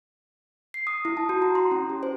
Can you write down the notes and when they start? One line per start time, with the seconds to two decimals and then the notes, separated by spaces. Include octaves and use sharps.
0.74 C7
0.87 D#6
1.05 E4
1.17 A5
1.29 F#4
1.42 A#5
1.55 C6
1.71 C#4
1.90 G4
2.03 C5